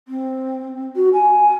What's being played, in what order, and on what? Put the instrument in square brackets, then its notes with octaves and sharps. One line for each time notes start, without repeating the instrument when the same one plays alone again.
[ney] C4
F#4
G#5